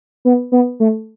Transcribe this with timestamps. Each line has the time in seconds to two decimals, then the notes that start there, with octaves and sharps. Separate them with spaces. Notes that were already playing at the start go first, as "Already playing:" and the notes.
0.25 B3
0.52 B3
0.80 A3